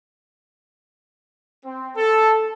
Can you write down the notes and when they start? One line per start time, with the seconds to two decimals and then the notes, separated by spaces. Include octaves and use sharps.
1.65 C4
1.96 A4